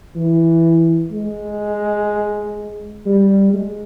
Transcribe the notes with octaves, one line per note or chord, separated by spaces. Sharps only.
E3
G#3
G3
G#3